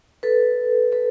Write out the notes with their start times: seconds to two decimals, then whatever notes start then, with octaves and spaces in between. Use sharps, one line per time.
0.23 A4 B4
0.92 A4 B4